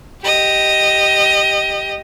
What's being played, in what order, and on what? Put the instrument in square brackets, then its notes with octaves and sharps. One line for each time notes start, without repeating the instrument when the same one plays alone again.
[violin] G4 D#5